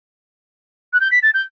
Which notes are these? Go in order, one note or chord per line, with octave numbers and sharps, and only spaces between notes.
F#6
G6
B6
A6
G6